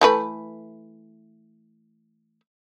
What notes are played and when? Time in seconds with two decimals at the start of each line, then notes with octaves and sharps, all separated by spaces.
0.01 E3 A3 B4